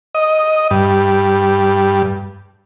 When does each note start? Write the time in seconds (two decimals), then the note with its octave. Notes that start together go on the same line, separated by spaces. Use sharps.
0.15 D#5
0.71 G2